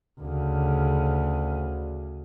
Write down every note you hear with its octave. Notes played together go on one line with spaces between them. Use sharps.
D2 C#3